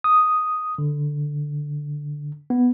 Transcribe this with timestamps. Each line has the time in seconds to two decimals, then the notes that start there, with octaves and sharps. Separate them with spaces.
0.04 D#6
0.78 D3
2.50 B3